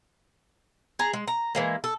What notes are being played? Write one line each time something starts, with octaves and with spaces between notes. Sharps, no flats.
G#4 A#5
G#3
A#5
E3 G#3 A#3
A4